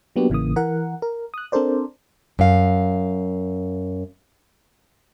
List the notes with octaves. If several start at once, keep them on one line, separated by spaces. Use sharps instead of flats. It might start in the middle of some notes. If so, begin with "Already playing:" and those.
F#3 A#3 B3 D4 F#4 G4
A1 C#3 E3 A#3 D#6
E3 A#4 F#5
A#4
D#6 F#6
C4 D4 A4 A#4 C5 D5
F#2 F5